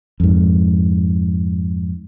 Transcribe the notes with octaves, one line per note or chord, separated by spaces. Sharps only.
F2 G#2